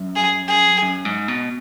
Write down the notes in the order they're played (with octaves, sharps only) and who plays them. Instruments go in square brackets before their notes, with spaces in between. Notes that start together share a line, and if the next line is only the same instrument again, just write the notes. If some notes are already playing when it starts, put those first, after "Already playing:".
Already playing: [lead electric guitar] F#2
[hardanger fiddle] G#4
G#4
[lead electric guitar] F#2
G#2
B2